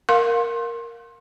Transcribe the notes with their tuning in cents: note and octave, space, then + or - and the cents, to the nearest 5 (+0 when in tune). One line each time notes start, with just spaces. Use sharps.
A#4 +0 F5 +25 C6 +25